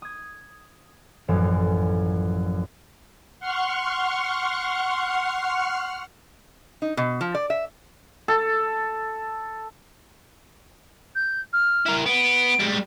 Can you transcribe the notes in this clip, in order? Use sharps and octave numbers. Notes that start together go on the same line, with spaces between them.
D#6 G#6
A1 F#2 F3
F#5 C6 C#6 F6
D#4
B2
F3
D5
E5
A4
G6
F6
E4 A#4
B3 D7
G3 G#3